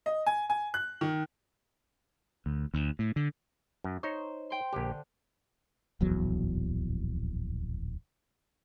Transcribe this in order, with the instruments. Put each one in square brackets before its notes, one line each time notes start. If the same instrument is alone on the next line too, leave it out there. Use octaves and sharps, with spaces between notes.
[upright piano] D#5
G#5
G#5
F#6
D#3
[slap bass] D2
D2
A2
D3
[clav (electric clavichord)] F#2
[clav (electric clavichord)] D#4 C#5 [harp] C5
[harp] G5 C6
[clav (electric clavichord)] A#1 G4 [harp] D3
[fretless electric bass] D1 A#1 E2 F#3